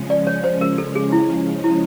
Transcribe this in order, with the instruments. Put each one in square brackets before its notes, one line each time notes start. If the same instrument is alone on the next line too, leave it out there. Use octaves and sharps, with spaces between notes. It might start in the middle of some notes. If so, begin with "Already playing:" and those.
Already playing: [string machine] C#3 F3 G#3 C#4
[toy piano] D5
C#5
C5
A#4
A4
G#4
E4
E4